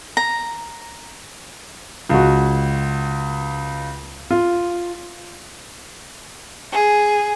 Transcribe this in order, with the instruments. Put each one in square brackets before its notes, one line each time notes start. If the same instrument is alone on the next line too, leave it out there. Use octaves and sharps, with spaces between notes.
[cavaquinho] A#5
[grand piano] C#2 F#4
F4
[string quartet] G#4